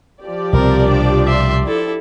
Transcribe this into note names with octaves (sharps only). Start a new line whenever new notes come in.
F3 G4 D5
C2 B2 C4 A#4
D4
E5 C6
E4 A4